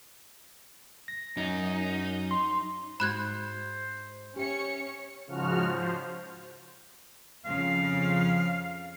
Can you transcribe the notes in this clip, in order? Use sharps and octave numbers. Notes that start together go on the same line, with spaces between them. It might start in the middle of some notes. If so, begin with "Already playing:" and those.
A#6
F#2 D#4
C6
G#2 F#4 C5 F#5 B5 F#6 G#6
C#4 G4 C#5 E5 C#7
G#2 C#3 F3 F#4 F6
F3 C5
F2 C#3 F3 F5